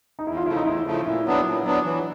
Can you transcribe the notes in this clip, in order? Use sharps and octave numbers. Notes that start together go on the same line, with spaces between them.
D#4
E2 E4
F4
C#3 F3 A3 E4
D#4
E2 E4
C#3 F3 A3
A#2 E4
F#3 B3 D4
A#2
F#3 B3 D4
E3